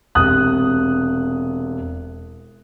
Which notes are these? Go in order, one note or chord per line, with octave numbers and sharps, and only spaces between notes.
E1 C3 D#6 F#6